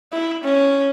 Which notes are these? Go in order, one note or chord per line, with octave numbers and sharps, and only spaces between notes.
E4
C#4